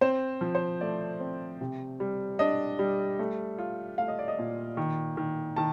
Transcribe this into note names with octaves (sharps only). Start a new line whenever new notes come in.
C4 C5
F3
C5
A3 D5
C4
C3
G3
D4 D#5
G3
A3
F4
A3 F5
D#5
D5
D#5
A#2
D#3
D#3
D#3 A5